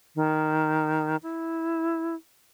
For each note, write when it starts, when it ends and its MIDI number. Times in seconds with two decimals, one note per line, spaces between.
0.16 1.16 51
1.23 2.15 64